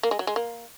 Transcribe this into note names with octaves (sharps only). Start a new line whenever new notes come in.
A#3
G#3
F#3
G#3
A#3